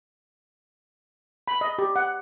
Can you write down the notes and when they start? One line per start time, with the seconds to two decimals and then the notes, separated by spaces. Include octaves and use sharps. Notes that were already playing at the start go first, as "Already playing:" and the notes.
1.48 B5
1.61 D#5
1.79 G4
1.96 F#5